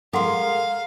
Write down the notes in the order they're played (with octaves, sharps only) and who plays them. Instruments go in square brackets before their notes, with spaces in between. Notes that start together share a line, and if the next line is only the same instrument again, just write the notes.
[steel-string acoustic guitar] G#3 A#4 [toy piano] A4 F#5 C6 [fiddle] F5